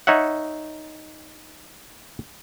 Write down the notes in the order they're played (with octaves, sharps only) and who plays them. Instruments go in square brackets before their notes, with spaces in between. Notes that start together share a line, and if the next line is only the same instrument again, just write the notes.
[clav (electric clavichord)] D#4 C#5 E5 F#5